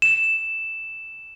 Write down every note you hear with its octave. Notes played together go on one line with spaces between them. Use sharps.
E7